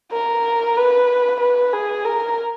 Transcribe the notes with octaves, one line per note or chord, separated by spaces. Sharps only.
A#4
B4
B4
G#4
A#4